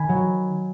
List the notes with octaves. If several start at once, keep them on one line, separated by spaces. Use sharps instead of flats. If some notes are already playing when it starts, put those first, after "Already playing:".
Already playing: D#3 G#5 B5
F#3